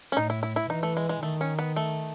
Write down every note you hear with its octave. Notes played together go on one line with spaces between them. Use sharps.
C#4
A2 D#4
E4
E4
E4
E3 D#4
A3
G#3
G#3
D#3 A3
C#4
B3
A3